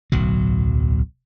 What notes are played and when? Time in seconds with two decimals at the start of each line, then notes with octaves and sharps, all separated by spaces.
0.12 D1 B1 F#3